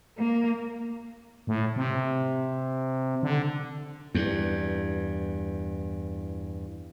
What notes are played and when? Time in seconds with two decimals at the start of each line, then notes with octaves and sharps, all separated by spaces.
0.17 A#3
1.47 A2
1.76 C3
3.23 D3
4.14 E2 G2